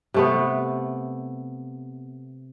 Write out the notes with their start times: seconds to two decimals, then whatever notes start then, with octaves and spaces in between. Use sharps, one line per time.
0.14 C3 A3 B3